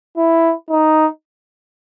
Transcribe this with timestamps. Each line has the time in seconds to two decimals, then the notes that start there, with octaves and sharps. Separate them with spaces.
0.17 E4
0.70 D#4